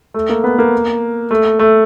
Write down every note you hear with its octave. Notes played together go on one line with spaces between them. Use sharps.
A3
A#3
B3
A#3
A3
A3